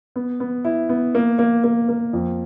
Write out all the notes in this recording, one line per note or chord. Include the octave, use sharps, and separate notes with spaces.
B3
B3
E4
B3
A#3
A#3
A#3
A#3
F2